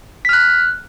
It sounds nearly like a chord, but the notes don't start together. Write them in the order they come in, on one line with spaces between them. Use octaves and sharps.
B6 F6 F#6